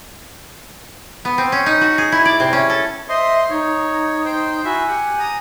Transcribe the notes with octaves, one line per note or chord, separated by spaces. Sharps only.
B3
C4
C#4
D#4
F#4
G#4
E4
D5
C3
C#4
A4
C5 D#5 E5 C6
D#4 C#5
C5 G5
E4 F#4 E5 G#5
G4 F#5
A#5 D#6